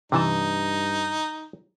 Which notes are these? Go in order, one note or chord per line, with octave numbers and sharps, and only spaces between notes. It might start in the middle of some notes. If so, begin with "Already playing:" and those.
G2 C3 E3 D#4 A5